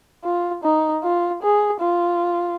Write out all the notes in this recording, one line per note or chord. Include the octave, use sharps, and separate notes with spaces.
F4
D#4
F4
G#4
F4